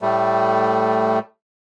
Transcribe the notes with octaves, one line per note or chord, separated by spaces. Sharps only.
A2 G3 A3